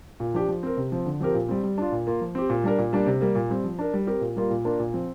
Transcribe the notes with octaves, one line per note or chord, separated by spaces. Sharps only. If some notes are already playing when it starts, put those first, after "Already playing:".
A#2
F3 D4 G4
F3
C4 A#4
C3
F3 C4
D3
F3 C4 G4 A#4
A#2
G3 C4
G3
D4 F4
A#2
A#3 F4
F3
C4 G4
A#2
G3 D4 A#4
A#2
G3 A#3 D4
C3
G3 A#3
A#2
G3 C4
F3
D4 A#4
G3
C4 G4 A#4
A#2
G3 A#3 F4 A#4
A#2
A#3 D4 F4 A#4
A#2
F3 C4